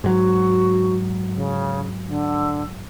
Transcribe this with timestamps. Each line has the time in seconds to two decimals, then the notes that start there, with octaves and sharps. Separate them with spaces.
0.04 G#2 F#3 F#4
1.33 C#3
2.05 D3